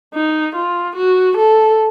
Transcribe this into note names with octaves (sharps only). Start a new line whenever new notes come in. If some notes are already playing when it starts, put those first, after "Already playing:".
D#4
F4
F#4
A4